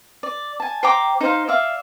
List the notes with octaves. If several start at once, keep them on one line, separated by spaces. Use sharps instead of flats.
D5
G#5 A5
C5 G5 A#5 D6
D#4 C5 F5
D5 E5 F5